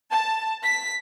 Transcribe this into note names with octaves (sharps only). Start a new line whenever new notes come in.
A5
B6